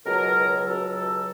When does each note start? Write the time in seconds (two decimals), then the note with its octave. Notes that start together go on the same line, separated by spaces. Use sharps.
0.06 C#2 B2 F#3 A#4
0.65 C#2 B2 F#3 A4
0.96 A4